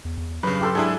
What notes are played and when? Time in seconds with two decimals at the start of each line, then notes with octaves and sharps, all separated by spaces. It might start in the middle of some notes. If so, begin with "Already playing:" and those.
0.05 E2
0.18 E2
0.43 G2 C#3 F#3 B4
0.61 G4 A4 C6
0.75 G#2 D4 E4 G#4 A4